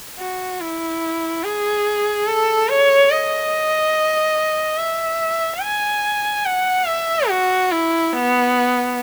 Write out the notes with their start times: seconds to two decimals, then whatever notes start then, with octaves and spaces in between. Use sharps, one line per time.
0.18 F#4
0.60 E4
1.43 G#4
2.27 A4
2.69 C#5
3.11 D#5
4.78 E5
5.62 G#5
6.45 F#5
6.87 E5
7.29 F#4
7.71 E4
8.13 B3